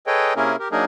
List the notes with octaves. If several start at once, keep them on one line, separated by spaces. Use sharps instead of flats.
G#4 A4 B4 C#5 D#5 G5
C3 A#3 C#4 E4 G#4 A#4
G4 A#4
F#3 A#3 D4 D#4 G#4 A#4